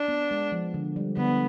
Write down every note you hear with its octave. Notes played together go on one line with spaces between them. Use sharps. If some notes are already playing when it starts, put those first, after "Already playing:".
Already playing: D4
B3
G#3
F3
D3
G3
D3 B3